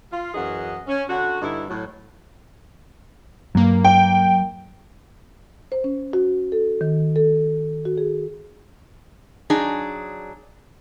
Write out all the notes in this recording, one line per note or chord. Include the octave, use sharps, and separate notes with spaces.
F4
F#2 E3 G#4 D#5 F#5
C#4
D3 F#4
G2 D3 D#4 E4
A2 F#3
G2 F#3 A#3
G5
C5
C#4
F#4
A4
D#3
A4
F#4
G#4
F#3 D4 D#4 G#4